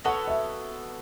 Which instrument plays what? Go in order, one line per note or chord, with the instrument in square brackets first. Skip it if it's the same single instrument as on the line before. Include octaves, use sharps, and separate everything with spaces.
[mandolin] B3 F#4 A4 C#5 [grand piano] F#5
[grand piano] E5